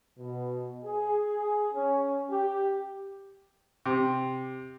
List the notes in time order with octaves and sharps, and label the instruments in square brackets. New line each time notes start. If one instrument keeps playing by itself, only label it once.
[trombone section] B2
G#4
C#4
G4
[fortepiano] C3